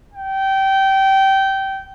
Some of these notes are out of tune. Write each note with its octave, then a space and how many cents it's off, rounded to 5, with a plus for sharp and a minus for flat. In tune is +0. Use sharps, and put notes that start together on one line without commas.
G5 -20